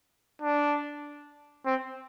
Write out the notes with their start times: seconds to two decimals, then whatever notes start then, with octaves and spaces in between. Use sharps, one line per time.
0.41 D4
1.66 C4